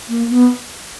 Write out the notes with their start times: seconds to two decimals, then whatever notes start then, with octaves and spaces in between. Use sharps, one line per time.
0.09 A#3
0.30 B3